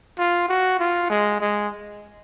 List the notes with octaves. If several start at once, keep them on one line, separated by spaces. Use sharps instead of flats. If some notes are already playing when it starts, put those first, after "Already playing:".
F4
F#4
F4
G#3
G#3